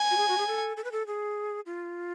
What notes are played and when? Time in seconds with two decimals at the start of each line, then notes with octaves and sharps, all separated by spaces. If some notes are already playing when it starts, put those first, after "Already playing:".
Already playing: G#5
0.11 F#4
0.17 G#4
0.28 F#4
0.38 G#4
0.47 A4
0.77 A4
0.84 B4
0.92 A4
1.07 G#4
1.66 F4